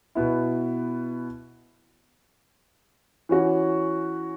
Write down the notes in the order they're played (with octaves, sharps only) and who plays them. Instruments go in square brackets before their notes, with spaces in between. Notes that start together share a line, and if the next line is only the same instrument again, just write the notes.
[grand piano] B2 B3 E4
E3 C#4 F#4